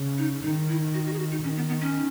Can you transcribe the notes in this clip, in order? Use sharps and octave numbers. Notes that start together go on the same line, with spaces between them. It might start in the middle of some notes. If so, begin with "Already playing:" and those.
Already playing: C#3
D#4
D#3 D#4
E4
F#4
F#4
G#4
F#4
D#4
D#3 C#4
B3
B3
C#4